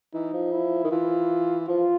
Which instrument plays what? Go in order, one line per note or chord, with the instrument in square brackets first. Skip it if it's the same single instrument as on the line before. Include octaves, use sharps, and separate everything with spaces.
[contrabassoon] E3 [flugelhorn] D#4
[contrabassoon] F3
[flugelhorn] E4
[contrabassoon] D#3
[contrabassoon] E3 [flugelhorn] F4
[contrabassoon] F3 [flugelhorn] F4